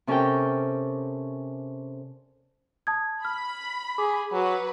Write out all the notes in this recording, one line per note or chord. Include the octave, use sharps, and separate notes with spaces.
C3 C#4 A4 A#4 D5 G5
A5 D#6 G#6
B5 F6
G#4 D6
F#3 B4